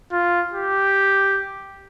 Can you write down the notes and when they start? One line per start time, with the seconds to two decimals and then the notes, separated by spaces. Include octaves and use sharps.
0.12 F4
0.53 G4